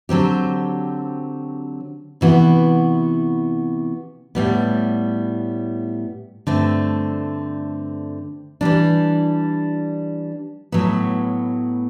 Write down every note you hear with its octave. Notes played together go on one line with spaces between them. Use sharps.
D3 F#3 C4 G4
C3 E3 B3 F#4
A2 G3 B3
G2 D3 A3 C4
E3 G3 D4
A2 F#3 B3